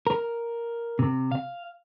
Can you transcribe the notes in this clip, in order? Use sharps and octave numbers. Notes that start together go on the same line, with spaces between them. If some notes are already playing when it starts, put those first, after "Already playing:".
A#4
C3
F5